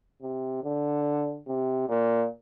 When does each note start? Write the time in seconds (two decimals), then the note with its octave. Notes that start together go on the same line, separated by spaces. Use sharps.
0.22 C3
0.64 D3
1.47 C3
1.89 A#2